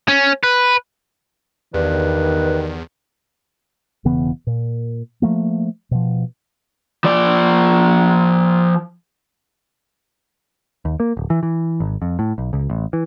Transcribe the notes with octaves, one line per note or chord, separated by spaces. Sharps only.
C#4
B4
E2 G2 D#3 B4
E1 C#3 E3 B3
A#2
F3 A3 A#3
B2 F3
F3 D5
D#2
A#3
D1
E3
E3
G#1
F2
A2
B1
C#2
A1
E3